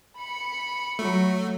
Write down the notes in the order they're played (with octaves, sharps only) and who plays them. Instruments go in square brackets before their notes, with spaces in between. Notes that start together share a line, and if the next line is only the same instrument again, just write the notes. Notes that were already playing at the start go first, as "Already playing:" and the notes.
[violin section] B5 C#7
[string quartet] F#3 [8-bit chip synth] A3